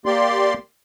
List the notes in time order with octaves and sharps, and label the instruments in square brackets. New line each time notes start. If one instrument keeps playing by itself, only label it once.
[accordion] A#3 G4 D5 C6